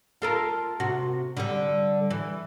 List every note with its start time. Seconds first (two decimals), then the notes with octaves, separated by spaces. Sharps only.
0.22 F4 A4 A#4
0.80 C3 F#4
1.37 D3 G3
2.10 E3